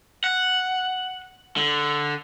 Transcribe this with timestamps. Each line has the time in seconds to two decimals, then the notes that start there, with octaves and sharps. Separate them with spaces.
0.24 F#5
1.57 D3